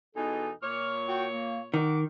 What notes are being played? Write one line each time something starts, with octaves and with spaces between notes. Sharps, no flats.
E2 B2 D#4 A4 G#5
A#2 C#5 D6 F6
F#4 F#5 G5
A#3
D#3 D#4 F#5 D6